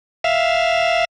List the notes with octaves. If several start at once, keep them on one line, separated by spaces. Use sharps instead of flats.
E5 F5